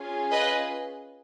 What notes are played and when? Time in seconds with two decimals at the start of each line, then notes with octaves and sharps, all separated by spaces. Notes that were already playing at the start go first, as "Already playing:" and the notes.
Already playing: C#4 F4 G#4
0.32 B4 D#5